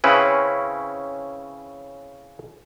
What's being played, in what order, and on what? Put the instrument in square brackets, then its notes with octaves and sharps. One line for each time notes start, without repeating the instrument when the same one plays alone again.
[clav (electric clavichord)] C#3 C4 C#4 E4 B4